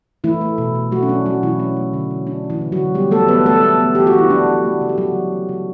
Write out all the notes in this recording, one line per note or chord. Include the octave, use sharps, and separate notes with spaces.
E3 A3 E4
A3
B2
B2
F#3 A3 F#4
C#4
A3 D4
B2 F#3 F#4
B2 E3 E4
A3 C#4
A3
D3
D3
A3 D4
A3
E3 E4
D3
F#3 F#4
D3
G3 B3 G4
A3 B3 A4
E3 B3 B4
E3 A3 A4
B3
B3
E3 G4
F#4
E3
E4
C#3 D4
E3
A3
C#3
G4
C#3 F#3 F#4
E3
A3
C#3